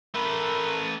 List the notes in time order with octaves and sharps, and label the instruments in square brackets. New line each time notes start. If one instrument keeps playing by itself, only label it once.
[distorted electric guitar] A3 B4 [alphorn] A#4